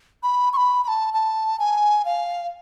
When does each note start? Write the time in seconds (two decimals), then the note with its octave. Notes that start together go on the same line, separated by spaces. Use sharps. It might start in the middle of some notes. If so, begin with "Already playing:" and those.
0.23 B5
0.53 C#6
0.57 B5
0.84 B5
0.88 A5
1.14 A5
1.59 G#5
2.05 F5